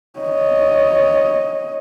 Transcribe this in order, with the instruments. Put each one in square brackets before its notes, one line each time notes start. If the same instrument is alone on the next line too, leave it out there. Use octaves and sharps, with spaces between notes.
[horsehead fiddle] C#5 D#5